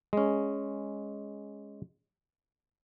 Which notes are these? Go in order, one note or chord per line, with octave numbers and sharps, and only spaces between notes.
G#3 C#4